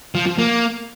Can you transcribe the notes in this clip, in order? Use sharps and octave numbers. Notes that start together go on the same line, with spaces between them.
F3
F3
A#3